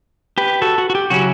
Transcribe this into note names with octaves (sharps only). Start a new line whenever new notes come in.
G4 B4
F#4 A4
F#4
F#4
G4
C#3 F#3 C#4 E4 F#4